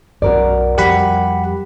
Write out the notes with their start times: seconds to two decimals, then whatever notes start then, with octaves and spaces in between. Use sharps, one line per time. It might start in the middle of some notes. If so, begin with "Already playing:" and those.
0.22 B1 F#2 F#4 A#4 D5
0.78 F2 F3 G3 G4 F#5 B5